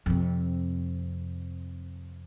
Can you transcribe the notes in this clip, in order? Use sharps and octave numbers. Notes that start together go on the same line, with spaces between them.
F2 C3